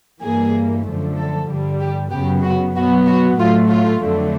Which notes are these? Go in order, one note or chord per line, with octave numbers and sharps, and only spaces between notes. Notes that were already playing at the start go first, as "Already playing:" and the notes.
G2 E3 G3 A#3 G#4
F#2 D3 F3 A3
A4
G2 D3 G3
G4
F#2 C#3 F#3 B3 G4
F#4
B2 F#3 B3 F#4
F#4
A2 F#3 A3 F4
F4
F2 D3 F#3 A3